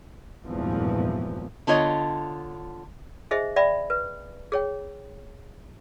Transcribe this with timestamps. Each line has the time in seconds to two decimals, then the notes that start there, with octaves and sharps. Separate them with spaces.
0.45 G#1 E2 G2 A#2 E3 F3
1.67 D3 B3 F4 C#5 D#5
3.31 D#4 G#4 C5 D#5 E5
3.56 D5 E5 G5 B5
3.90 B4
4.52 G#4 C#5 G5